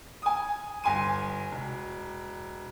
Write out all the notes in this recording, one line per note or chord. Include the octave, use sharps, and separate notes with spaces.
G#5 D#6
G1 G#5 C6 D#7
E1